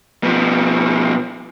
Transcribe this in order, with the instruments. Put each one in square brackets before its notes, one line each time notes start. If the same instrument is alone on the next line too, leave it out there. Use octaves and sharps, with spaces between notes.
[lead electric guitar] B2 F3